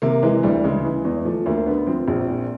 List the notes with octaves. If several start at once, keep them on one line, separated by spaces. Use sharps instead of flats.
C3 A#3
E3 G#3
D2 G3
C#3 G#3
E3
E2
F3 A3
D2 A#3
D3 B3
F3 C4
A#1
A#2